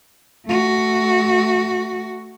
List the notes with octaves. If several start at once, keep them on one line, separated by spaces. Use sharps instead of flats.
A3 F#4